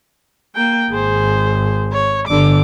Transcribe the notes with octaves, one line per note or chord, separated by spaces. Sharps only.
A#3 G5
G#1 G#4 C5
C#5
G1 D3 D6